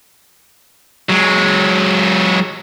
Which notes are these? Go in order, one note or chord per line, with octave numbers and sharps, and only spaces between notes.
F#3 G#3